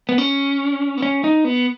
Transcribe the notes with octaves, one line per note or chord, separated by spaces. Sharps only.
B3
C#4
B3
C#4
D#4
B3